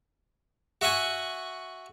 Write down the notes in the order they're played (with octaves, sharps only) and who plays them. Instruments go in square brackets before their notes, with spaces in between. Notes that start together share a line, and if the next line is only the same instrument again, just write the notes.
[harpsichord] F#4 E5 F#5 G#5 C#6